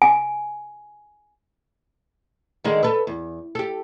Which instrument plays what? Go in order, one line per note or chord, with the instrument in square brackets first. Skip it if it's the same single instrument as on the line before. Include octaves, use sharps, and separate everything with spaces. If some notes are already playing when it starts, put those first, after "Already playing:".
[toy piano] G#5
[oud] D3 D#3 G#3
A4 B4
E2
G4 A4